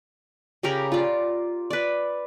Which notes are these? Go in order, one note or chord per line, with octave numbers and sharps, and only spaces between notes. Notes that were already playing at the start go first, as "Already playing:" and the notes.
C#3 G4 A#4 B5
F4 D5
B4 D5